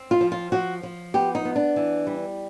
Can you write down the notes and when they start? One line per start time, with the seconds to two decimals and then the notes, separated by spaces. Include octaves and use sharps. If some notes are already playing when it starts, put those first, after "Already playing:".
Already playing: C4
0.11 F4
0.21 F3
0.32 F4
0.52 F3 F#4
0.83 F3
1.14 B3 G4
1.35 D#4
1.45 B3
1.56 D4
1.76 E3
2.07 G3